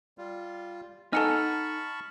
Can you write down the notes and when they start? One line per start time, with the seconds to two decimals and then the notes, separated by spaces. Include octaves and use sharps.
0.18 G3 F4
1.13 D#4 A4 F#5 G#5 A5 B5 C#6 F6